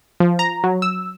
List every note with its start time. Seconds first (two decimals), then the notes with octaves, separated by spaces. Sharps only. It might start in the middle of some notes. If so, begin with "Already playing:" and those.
0.20 F3
0.39 A#5
0.64 F#3
0.82 E6